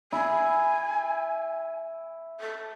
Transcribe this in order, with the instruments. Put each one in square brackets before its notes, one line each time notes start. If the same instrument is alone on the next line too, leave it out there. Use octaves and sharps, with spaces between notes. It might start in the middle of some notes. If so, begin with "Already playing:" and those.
[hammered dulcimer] E4 [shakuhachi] G#5
[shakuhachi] A4